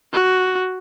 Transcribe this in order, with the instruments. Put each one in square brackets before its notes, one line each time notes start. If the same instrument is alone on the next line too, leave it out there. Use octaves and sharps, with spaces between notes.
[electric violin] F#4